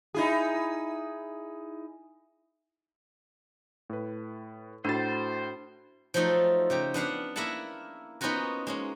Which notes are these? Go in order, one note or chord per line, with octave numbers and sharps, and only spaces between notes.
D#4 E4 G#4
A2 B4
A2 D4 F#4 C5 B5 A6
F3 F#3 A3 D#4 F4 A4
C#3 G4 A#5
B3 D4 F5 F#5
A#3 E4 A#4 E5 F#5 A5
B3 C#4 D#4 F4 F#4 A#4
G#3 A#3 C#4